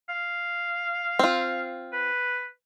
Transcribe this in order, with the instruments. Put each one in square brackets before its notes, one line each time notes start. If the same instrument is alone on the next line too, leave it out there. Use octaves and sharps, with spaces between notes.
[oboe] F5
[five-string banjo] C4 F4
[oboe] B4